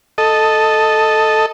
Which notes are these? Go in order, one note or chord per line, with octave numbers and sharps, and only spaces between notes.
A4 D#5